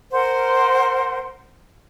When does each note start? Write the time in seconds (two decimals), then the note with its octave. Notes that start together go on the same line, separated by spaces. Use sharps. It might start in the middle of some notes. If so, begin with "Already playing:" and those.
0.13 A#4 C5 F#5